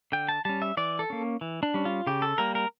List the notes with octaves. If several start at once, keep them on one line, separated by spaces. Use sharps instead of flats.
D3 G5
A5
G3 C#4 A5
E5
E3 D5
A4
A#3 C#4
E3
D4
G3 C#4
F4
C#3 G4
A4
G3 A#3 A#4
A#4